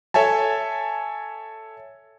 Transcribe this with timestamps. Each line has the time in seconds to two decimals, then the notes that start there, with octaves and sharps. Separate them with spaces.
0.14 A4 C#5 E5 G#5 A5